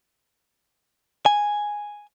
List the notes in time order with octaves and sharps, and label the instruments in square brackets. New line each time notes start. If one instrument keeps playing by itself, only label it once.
[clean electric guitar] G#5